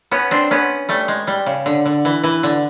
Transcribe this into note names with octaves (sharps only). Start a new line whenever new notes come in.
B3 C#4
C4 D4
B3 C#4
G3 A3
G#3
G3
C#3
D3
D3
E3
E3
D3